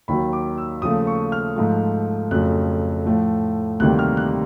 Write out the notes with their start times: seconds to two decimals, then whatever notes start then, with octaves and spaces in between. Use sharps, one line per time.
0.08 D#2 D#3 F#3 B5
0.33 D6
0.57 E6
0.82 D#2 C#3 F3 A3 D#6
1.07 C#6
1.32 F6
1.56 G#2 F3 A3
2.31 F2 C#3 F#3 A3 F#6
3.06 A2 F3 A3
3.80 D2 C3 D#3 G3 A#3 F#6
3.99 F6
4.17 F#6